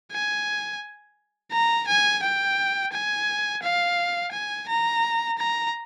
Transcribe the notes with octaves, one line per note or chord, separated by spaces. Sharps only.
G#5
A#5
G#5
G5
G#5
F5
G#5
A#5
A#5